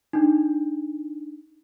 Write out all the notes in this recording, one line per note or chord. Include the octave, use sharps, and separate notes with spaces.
D4 D#4